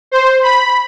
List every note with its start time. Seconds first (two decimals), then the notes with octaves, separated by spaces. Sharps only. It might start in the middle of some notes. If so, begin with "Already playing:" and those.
0.11 C5
0.43 B5